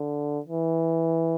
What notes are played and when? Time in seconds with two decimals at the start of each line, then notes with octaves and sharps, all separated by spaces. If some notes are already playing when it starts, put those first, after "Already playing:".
Already playing: D3
0.45 E3